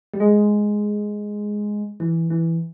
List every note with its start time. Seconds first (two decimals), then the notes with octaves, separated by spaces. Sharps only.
0.14 G3
0.20 G#3
2.00 E3
2.30 E3